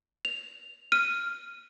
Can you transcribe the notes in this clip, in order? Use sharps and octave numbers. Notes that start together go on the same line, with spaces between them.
F7
F6 D#7